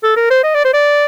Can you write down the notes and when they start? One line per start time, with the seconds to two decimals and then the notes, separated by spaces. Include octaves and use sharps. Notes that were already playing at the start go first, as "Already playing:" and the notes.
0.04 A4
0.17 A#4
0.31 C5
0.44 D#5
0.55 D5
0.65 C5
0.74 D5